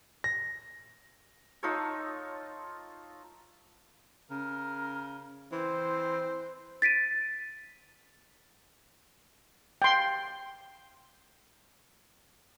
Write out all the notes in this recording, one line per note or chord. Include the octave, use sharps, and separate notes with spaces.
A#6
D#4 F4 A4 C#5
C#3 A#4
E3 C4 C5
A6 B6 D7 D#7
G5 C6